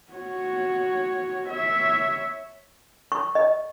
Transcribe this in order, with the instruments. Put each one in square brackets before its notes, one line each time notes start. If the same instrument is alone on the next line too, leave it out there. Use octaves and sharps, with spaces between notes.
[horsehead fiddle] F#4 C#5
C#5 E5
[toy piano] C#6
D#5